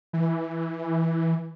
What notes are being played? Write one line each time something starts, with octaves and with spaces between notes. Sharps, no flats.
E3